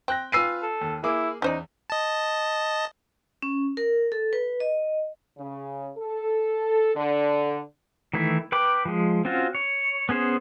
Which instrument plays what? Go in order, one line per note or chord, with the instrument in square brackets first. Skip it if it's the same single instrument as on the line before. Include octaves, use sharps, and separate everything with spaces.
[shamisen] C4 [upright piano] G5 F#6 A#6
[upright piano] F4 B4 G#5 [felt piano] E6 C7 D#7
[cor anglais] A4
[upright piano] D#2
[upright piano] A#3 G#4 D6 [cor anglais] E4
[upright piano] E2 [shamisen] C#4 C5 D5 [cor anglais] D#4
[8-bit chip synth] D#5 A5
[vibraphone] C#4
A#4
A4
B4
D#5
[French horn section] C#3
A4
D3
[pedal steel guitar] D#3 E3 A3 E4
B4 G5 B5 D6
F3 G#3
C4 C#4 F4 F#4
C#5
B3 C#4 G#4 C5